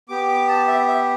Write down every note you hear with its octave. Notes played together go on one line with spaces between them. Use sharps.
B3 G4 D6
D6
A5
E5
E5